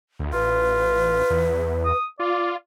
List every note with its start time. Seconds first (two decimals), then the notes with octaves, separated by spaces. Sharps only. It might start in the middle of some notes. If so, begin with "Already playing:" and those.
0.19 D2
0.33 A1 F4 B4
1.30 E2
1.85 D#6
2.20 F4 D5